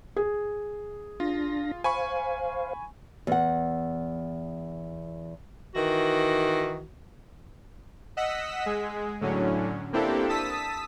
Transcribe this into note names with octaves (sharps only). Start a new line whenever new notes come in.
G#4
D4 F4 A#6
C5 F5 G#5 B5 C#6
E2 F#5
D#3 E3 F#4
D#5 F#5 E6 B6
G#3 G#4
A2 D3 F#3 C#4
A#3 C4 D4 E4 G4 A4
A5 D#6 E6 B6